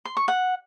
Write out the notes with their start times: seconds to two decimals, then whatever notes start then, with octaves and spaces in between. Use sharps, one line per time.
0.05 C6
0.17 C#6
0.28 F#5